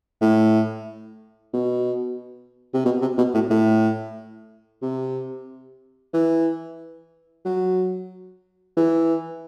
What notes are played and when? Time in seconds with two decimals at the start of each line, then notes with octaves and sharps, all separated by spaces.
0.22 A2
1.53 B2
2.74 C3
2.85 B2
3.02 C3
3.18 B2
3.34 A2
3.50 A2
4.82 C3
6.14 E3
7.45 F#3
8.77 E3